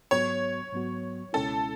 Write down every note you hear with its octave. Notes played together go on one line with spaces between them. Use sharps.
G#2 F#3 B3 F#4 C#5
G#2 F#3 B3 F#4
C#2 B2 G#3 C#4 E4 A4